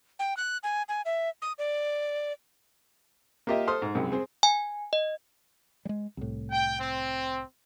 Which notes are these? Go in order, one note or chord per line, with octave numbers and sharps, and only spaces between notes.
G5
F#6
G#5
G#5
E5
D#6
D5
A#3 F4 G4 A#4 D#5 E5
A4 C5 C6 D#6 F6
G#2
C2 F#2 G#3
C4 G#4
G#5
D#5
G3 G#3
C2 A2
G5
C4